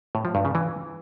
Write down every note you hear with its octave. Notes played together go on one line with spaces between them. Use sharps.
A2
F3
G2
C#3
E3